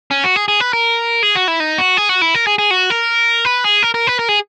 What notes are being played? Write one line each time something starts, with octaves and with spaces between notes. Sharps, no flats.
C#4
F#4
G#4
G#4
B4
A#4
G#4
F#4
E4
D#4
F#4
G#4
F#4
E4
A#4
G#4
G#4
F#4
A#4
B4
G#4
A#4
A#4
B4
A#4
G#4